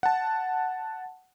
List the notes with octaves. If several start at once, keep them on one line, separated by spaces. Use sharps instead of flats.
F#5 A5